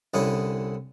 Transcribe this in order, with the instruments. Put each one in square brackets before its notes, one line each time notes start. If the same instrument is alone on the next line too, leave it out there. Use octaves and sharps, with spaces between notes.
[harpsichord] C2 D3 C#4 E4 D#6